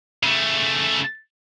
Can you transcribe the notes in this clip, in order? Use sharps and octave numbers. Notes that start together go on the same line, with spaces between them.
C#3 A3